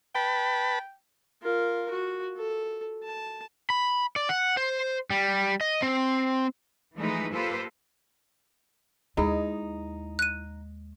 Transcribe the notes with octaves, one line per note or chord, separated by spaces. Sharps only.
B4 G5 A5 B5
F4 A#4
F#4
A4
A5
B5
D5
F#5
C5
G3
D#5
C4
E3 F3 G#3 A3 D#4 B4
A#3 F4 G4 A4 B4 C5
D#2 G#3 D#4 E4 G#4
F#6 D#7